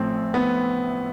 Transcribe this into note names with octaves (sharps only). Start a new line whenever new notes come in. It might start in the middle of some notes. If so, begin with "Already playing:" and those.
Already playing: A1 A2 F3 A3 C4
B3